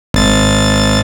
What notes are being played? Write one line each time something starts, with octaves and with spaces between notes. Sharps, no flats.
G#1 A6